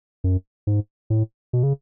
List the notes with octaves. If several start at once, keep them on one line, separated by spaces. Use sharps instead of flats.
F#2
G#2
A2
B2
C#3